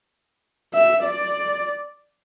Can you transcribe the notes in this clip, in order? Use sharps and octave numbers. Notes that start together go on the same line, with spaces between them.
E5
D5